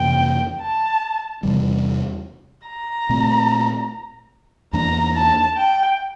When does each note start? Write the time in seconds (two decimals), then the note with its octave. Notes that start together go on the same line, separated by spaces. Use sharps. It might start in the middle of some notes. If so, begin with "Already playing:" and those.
Already playing: F2 C3 E3 A#3 G5
0.61 A5
1.43 E2 C3 E3 G3
2.68 A#5
3.09 A#2 A3 C4
4.73 E2 E3 A#3 D4 A#5
5.15 A5
5.56 G5